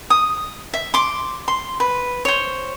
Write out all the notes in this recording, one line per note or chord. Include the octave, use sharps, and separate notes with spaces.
D#6
E5
C6 D6
C6
B4
C5 C#5